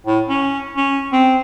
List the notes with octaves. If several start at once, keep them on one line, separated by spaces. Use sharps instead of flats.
A2
C#4
C#4
C4